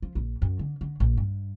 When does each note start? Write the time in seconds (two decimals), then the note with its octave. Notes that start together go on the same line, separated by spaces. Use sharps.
0.02 F3
0.15 A#1
0.42 F#2
0.59 D3
0.81 D3
1.00 A#1
1.18 G2